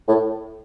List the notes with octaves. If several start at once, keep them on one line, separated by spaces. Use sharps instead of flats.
A2